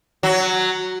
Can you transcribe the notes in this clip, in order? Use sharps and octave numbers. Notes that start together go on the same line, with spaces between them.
F#3